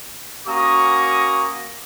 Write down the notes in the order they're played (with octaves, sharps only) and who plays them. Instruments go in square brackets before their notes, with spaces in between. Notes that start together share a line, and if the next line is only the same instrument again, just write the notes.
[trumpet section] A#3 C#4 F#4 A#5 C#6 D#6